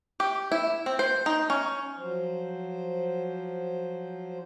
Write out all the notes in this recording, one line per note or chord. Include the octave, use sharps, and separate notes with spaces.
G4
E4
C4
C5
D#4
C#4
F3 F#3 C5